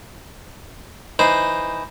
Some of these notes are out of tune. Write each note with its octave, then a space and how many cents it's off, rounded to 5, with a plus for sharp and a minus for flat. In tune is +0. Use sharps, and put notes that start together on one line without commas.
E3 +0 D#4 +0 C5 +0